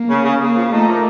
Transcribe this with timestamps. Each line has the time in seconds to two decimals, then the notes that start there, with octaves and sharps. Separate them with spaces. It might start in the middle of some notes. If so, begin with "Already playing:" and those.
Already playing: A#3
0.09 C#3
0.24 C#3
0.40 C#3 A#3
0.56 F3
0.72 A3 D#4
0.88 A#3